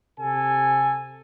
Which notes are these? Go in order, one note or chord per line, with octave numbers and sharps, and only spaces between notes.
C3 A4 G#5